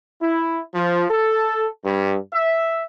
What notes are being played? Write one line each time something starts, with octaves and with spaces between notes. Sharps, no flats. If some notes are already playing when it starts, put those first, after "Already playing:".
E4
F3
A4
G2
E5